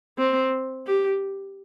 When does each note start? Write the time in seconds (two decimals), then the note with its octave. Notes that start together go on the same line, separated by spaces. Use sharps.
0.18 C4
0.87 G4